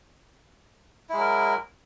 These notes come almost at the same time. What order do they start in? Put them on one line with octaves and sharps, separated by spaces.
E4 G#3 F#3 A#4